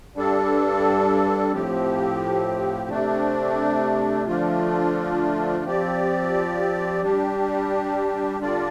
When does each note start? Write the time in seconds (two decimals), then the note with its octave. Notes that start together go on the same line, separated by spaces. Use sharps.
0.15 G2 G3 D4 A4
1.52 A2 F3 C4 G4
2.90 C3 A3 D4
4.27 D3 F3 A3 D4 F4
5.65 F3 C4 G4 D5
7.02 G3 D4 G4
8.40 D3 G3 D4 F4 D5